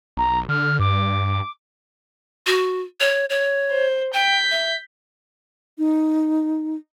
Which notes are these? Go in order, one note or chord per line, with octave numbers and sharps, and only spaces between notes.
B1 A#5
D3 F6
G2 D6
F#4
C#5
C#5
C5
G5 G6 B6
E5
D#4